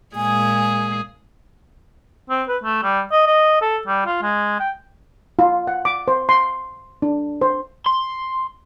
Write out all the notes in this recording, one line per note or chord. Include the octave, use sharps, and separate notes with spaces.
A#2 G#3 G#4 G#5
C4
B4
A3
G3
D#5
D#5
A4
G3
F4
G#3
G5
F4
F#5
D6
C5
C6
D4
C5
C6